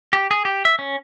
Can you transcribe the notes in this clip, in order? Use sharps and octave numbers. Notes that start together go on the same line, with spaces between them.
G4
G#4
G4
E5
C#4